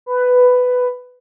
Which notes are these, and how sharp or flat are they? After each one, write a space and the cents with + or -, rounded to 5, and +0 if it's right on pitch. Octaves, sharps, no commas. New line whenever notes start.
B4 +10